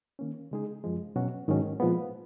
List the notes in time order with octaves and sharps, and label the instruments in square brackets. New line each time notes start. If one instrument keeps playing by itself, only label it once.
[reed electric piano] D#3 A#3 C#4
C#3 G#3 D#4 G#4
F#2 F3 G#3
B2 F#3 C#4 F#4
G#2 D#3 F#3 C#4
A#2 F3 G#3 B3